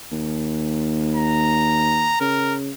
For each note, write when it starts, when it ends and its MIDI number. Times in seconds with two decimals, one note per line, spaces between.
0.11 2.13 39
1.16 2.19 82
2.21 2.71 49
2.21 2.55 70